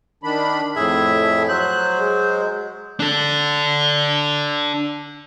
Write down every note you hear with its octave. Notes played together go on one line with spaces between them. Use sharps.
D#3 D4 B5
F2 A2 G#4 E5
F#3 C5 F#6
G#3
D4 A4